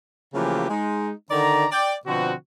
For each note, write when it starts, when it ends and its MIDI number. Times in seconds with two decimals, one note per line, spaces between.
0.34 0.67 49
0.34 0.67 52
0.34 0.67 53
0.34 0.67 57
0.34 0.67 58
0.34 0.67 67
0.70 1.11 56
0.70 1.11 63
1.30 1.65 50
1.30 1.65 51
1.30 1.65 74
1.30 1.65 82
1.71 1.94 74
1.71 1.94 79
2.06 2.33 47
2.06 2.33 50
2.06 2.33 53
2.06 2.33 60
2.06 2.33 66